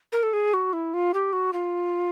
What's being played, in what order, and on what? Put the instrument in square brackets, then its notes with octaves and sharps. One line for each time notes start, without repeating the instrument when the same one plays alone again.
[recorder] A#4
A4
G#4
F#4
E4
F4
G4
F#4
F4